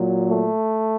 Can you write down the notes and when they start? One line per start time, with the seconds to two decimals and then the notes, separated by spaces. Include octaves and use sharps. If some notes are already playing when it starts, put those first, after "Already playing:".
Already playing: A#2 F#3
0.29 A3